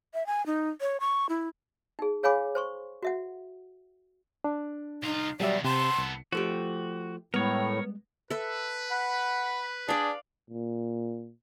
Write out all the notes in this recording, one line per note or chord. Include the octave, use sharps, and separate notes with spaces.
E5
G#5
D#4
C#5
C#6
E4
D#4 G#4
G#4 C#5 F5 G#5 B5 D6
C5 C6 C#6
F#4 E5 F#5
D4
C2 D#4 F4
B2 D#3 F#3 G3 D5 E5
C3 B3 A4 C6
C2
F3 A3 F#4 G4
A2 G3 G#3 B3 A#4 C#5
A4 B4 E5
F#5 B5
D4 G#4 D5 F5
A#2